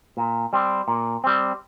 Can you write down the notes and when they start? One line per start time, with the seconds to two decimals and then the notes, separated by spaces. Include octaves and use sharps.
0.17 A#2
0.53 G3 C4
0.88 A#2
1.24 G3 C4